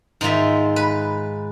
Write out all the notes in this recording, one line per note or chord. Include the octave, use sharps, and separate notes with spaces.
G#2 D#3 F4 E5
B4